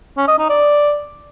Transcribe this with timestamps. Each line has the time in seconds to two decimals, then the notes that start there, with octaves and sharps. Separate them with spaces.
0.17 C#4
0.28 D#5
0.39 D#4
0.50 D5